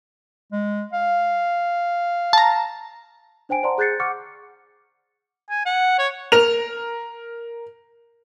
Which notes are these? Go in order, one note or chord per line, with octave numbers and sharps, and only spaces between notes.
G#3
F5
A5 A#5
D4 C5 G5 G#5 D7
C5 D5 F#5 A5 A#5 C6
G#4 F#6 G6 A6 C7 C#7
F#5 C#6 D6 F6 C#7
G#5
F#5
C#5
A#4 F7